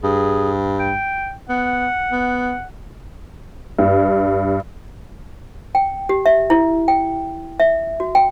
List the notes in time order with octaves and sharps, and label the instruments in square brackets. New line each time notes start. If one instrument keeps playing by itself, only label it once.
[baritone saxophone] G2 [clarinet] G#4
[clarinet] G5
[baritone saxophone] B3 [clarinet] F#5
[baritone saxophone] B3
[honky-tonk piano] G2
[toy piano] G5
G4
E5
E4
G5
E5
F#4
G5